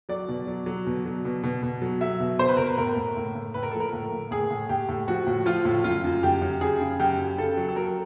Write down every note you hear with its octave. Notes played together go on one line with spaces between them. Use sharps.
F#3 D5
B2
F#3
F#3
B2
F#3
B2
B2
B2
F#3
F#3 E5
B2
B2 C5
B4
B2 A#4
B4
A2 A#4
A2
A2
A2
A2 B4
A#4
F3 A4
A#4
A2
A2
A2 G#4
A2
A2 G4
A2
F3 F#4
A2
F3 F4
A2
F#2 F4
F#2
F#2 G4
F#2
F#2 G#4
C#3
F#2 G4
F#2
C#3 A4
F#3
A4
F#3 A#4